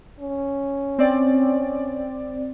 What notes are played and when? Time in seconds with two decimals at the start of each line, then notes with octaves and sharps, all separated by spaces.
0.20 C#4
0.99 C4 D5